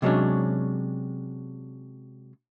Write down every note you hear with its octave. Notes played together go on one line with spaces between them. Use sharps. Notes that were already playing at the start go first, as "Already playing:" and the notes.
C3 F#3 G#3 C#4 D4